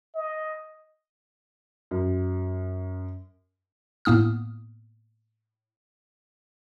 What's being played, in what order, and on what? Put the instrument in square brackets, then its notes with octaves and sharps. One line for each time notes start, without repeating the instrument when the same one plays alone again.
[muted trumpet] D#5
[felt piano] F#2
[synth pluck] A2 A#3 B3 D#6 F6